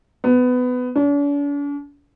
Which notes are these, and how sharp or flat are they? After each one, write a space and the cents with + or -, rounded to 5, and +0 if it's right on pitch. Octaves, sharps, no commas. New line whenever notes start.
B3 +20
D4 -45